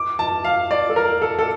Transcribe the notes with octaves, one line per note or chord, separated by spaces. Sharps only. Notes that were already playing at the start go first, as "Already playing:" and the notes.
Already playing: D6
A5
F5
D5
A4
A#4
A4
A4